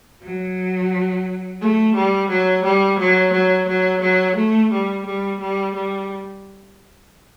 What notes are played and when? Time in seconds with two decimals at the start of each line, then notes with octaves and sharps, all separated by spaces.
0.22 F#3
1.60 A3
1.94 G3
2.29 F#3
2.63 G3
2.98 F#3
3.32 F#3
3.67 F#3
4.01 F#3
4.36 A3
4.71 G3
5.05 G3
5.40 G3
5.74 G3